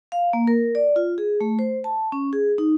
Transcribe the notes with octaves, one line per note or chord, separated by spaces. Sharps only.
F5
A#3
A#4
D5
F4
G#4
A3
C5
A5
C#4
G#4
D#4